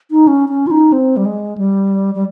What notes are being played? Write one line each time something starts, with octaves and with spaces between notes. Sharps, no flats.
D#4
C#4
C#4
F4
D#4
C4
G3
G#3
G3
G3